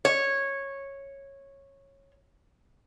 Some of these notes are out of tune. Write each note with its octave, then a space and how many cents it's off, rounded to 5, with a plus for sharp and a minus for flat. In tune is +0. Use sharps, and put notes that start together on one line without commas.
C#5 -10